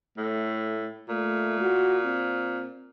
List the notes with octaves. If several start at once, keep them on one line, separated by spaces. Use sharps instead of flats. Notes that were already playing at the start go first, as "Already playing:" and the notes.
A2 A3
A#2 A3
F#4
C4